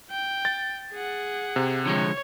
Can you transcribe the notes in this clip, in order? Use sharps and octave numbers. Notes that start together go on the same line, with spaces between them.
G5
A6
G#4 F#5
C3
D3 F3 G#3 C#5